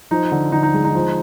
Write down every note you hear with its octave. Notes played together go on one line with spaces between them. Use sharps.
F3 D#4
D3
D3 D#4
D#4
G#3
D#4
F3